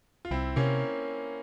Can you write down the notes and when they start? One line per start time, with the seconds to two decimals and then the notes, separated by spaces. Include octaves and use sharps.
0.25 F4
0.31 C2 C4 E4
0.56 C3 A#3 C#4